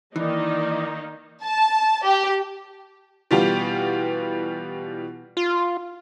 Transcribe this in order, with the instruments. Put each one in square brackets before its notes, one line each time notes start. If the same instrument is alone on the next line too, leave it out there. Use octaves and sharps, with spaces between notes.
[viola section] D#3 A#3 D#4 [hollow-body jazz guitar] E3 [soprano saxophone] D5
[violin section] A5
G4
[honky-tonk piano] B2 E3 G3 B3 F4 G4
[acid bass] F4